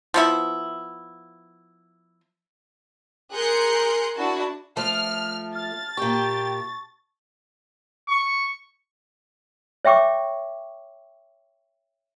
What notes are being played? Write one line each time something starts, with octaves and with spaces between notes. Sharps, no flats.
F3 B3 E4
G#4 A#4 C6 F#6 G6 C#7
D4 E4 F#4 A5
F3 A3 A5 F6
F6 A6
A#2 G4 G5 C#6
C#6
C#5 E5 G5 C#6 D6